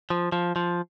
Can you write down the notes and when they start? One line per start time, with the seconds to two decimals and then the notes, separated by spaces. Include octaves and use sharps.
0.10 F3
0.32 F3
0.56 F3